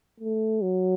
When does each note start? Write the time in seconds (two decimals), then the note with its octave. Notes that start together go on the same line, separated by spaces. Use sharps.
0.20 A3
0.62 F#3